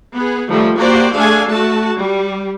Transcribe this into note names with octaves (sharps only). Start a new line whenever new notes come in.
B3 G#4
D#3 F3 G3 A3
A#3 F#4 G4 C5 D5
A3 D4 G#4 A4 F5 G#5
A3 F#4 A5
G3